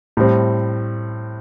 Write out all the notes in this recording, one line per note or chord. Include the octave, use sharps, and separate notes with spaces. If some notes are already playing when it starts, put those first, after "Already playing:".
A2 G3 C4